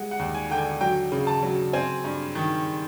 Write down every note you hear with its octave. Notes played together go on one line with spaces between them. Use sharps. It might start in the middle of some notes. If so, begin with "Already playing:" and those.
Already playing: G3 G#3 F#5
F#5
D#2
G#5
D3 G5
G#5
F#3 G5
C#3
A5
F#3
C4 G#5
G2
D#3